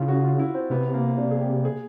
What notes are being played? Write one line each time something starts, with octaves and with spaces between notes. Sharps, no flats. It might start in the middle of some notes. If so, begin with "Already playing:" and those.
Already playing: C#3 E4 F4
F#4
F4
E4
C4
C3 B3
A#3
D4
G#4
G4
G#4